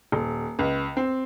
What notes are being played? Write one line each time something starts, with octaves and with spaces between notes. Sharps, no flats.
D#1
C#2
C4